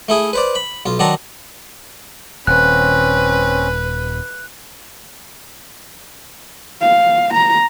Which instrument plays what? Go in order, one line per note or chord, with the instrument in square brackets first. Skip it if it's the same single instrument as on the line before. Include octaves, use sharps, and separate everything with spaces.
[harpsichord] A3 E4 G#4
B4 C5 D5
B5
B1 F4
D#3 F#3 D4 A5 A#5 C6
[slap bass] D#1 [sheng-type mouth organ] C4 C#4 [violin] B4 [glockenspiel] F#6
[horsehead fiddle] F5
A#5